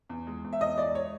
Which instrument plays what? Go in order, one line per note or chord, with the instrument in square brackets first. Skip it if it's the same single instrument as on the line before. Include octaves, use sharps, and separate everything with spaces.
[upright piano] E2
G#3
E2
E5
E2 D#5
G#3 D5
C#5